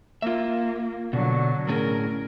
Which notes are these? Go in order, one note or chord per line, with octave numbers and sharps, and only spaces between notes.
A#3 F4 E5
B2 D3 F#3
A2 C#4 G#4 A#4